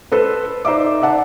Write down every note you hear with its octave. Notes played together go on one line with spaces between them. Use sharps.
A4 B4 C5
D#4 C5 D5 E5 D6
D5 E5 F#5 A5